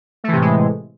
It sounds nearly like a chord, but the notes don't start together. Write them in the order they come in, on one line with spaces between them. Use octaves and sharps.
A3 E3 C3 A2 G#3